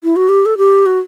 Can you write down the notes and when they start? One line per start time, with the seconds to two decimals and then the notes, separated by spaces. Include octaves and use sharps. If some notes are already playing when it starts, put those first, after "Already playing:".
0.04 E4
0.16 F#4
0.29 G4
0.46 A4
0.58 G4
0.86 F#4